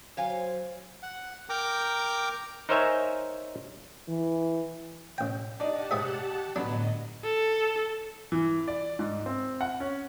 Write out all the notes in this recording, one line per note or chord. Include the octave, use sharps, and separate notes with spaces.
F#3 C5 C#5 F5 G#5
F#5
A#4 G5 A#5 D6
D#4 A#4 C5 C#5 E5 G#5
E3
A1 G5
D4 D#4 G4 D5 F#5 A5
G#2 G#4 E5
A2 D3 F#3 B3 D4 D#5
A4
E3
D5
G#2
C4
F#5
C#4